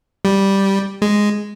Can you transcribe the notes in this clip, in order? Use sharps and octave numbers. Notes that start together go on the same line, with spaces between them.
G3
G#3